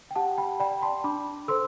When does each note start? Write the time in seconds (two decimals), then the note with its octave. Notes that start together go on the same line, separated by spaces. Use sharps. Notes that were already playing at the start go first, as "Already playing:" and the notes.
0.11 G5
0.16 G4 F#5 A5
0.38 G5 B5
0.60 D5 G5 B5
0.82 A5 C6
1.04 D4 B5 D6
1.48 A4 C5 C6 E6